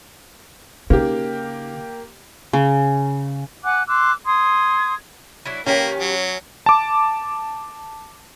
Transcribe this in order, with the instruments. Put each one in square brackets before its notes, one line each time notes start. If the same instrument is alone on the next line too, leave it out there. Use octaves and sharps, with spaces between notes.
[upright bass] C#3 D#4 [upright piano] A#3 G4
[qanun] C#3
[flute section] F#5 G#5 D6 F#6
C6 D6 E6 F#6
C6 D#6 G#6
[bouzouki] F#3 D4 E4
[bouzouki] D#3 G4 B4 [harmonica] A#3 [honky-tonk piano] C#4
[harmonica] F#3
[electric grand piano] A5 D6